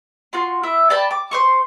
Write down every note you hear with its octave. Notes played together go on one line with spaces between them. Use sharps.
F4 F#4 C6
E4 E5
D5 G5 A5 B5
D6
C5 C6 C#6